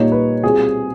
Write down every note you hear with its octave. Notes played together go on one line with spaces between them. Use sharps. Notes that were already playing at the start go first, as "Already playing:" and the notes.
Already playing: A#2 G3 A#3 D#4 C#5
B4
B2 G3 C4 F4 G#4